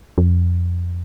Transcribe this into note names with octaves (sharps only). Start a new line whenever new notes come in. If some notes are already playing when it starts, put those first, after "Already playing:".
F2